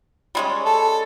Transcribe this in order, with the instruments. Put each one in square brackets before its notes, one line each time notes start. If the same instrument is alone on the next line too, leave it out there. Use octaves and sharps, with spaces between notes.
[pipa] G3 G#3 C#4
[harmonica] A4